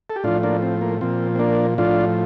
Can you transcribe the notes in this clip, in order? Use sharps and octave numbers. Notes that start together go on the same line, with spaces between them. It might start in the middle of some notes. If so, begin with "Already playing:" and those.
A4
G4
A2 F3 D4 F4
A#3 D4
C4
A#3
A#2 F3 C4
C4
A#3 D4
A2 F3 D4 F4